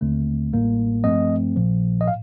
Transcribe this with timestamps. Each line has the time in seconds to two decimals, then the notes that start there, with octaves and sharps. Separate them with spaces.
0.01 D#2 D3 A3 C4
0.52 A1 A2 G3 A#3
1.04 G2 F3 A3 C4 D#5
1.56 A#1 A#2 F3
2.01 D#5
2.08 A2 F5